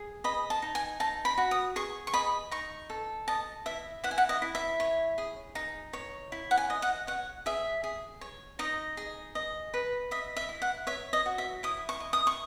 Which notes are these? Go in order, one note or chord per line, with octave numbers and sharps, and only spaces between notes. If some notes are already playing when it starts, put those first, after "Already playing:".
Already playing: G#4
D#5 B5
A5
D#4
G#5
D#4 A5
B5
F#4
D#6
G#4 C#6
C#6
D#5 B5
D#4 C#6
A4
D#5 A5
E4 E5
E4 F#5
G#5
F#5
D#5
E4
E5
C#5
G#4
D#4
C#5
E4
F#5
G#5
D#5
F#5
C#5 F#5
G#4 E5
G#4
C#5
D#4 D#5
G#4
D#5
B4
D#5 E5
E5
E4
F#5
C#5 E5
D#5
F#4
E5
E4 D#6
C#6
D#5
D#6
C#6